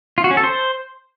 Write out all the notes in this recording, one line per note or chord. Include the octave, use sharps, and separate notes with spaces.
F4
F#4
C#4
A4
C5